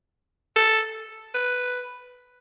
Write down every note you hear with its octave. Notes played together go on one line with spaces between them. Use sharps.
A4
B4